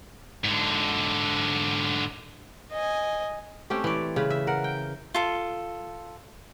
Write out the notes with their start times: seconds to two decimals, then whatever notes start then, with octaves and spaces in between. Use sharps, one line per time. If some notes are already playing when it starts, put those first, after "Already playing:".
0.45 G#2 D3
2.72 D#5 G#5
3.70 A3 C4 C#4 G4
3.84 E3 D5
4.16 C#3 B4
4.30 E5
4.47 A#4 F#5
4.64 G5
5.14 F4 A4